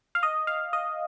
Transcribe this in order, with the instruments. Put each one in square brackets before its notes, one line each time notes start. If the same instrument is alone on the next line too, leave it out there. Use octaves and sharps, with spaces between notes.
[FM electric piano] F5
D#5
F5
D#5